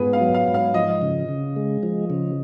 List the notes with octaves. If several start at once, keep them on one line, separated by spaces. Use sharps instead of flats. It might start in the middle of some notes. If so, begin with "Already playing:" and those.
Already playing: G#2 B3 F4 G#4 B4
F5
F#3
F5
G#2
F5
F3 D#5
C#3
C#3
G#3
F3
C#3